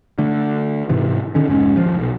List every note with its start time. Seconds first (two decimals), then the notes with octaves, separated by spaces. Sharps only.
0.19 D3 A3
0.89 G#2 C3 E3
1.35 D3 D#3 C#4
1.48 F1 G#2 C#4
1.76 D#1 F3
1.97 B1